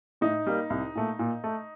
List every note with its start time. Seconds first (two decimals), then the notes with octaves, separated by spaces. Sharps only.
0.21 A2 D#4
0.47 G3 A#3
0.70 C2
0.95 A#2 A3
1.19 A#2
1.44 A3